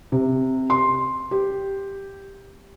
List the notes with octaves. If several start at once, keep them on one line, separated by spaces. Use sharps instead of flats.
C3
C6
G4